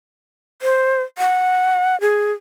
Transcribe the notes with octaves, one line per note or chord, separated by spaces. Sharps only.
C5
F#5
G#4